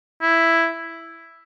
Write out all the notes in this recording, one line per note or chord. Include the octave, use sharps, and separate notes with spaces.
E4